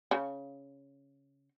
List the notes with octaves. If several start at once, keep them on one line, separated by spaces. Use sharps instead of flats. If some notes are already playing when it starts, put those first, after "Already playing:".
C#3